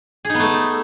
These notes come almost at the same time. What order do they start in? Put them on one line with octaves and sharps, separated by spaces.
G#4 D#4 B3 A3